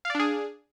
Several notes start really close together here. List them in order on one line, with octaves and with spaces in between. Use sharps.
F5 D5 D4 G#4